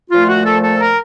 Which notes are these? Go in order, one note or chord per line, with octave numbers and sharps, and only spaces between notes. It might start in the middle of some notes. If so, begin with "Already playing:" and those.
A#2 F3 A3 F4
F#4
A4
A4
A#4